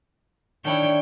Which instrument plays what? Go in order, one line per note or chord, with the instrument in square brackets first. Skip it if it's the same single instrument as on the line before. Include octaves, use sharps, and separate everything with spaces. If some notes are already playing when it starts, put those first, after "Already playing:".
[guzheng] D#3 D4 E4 [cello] C#5 G5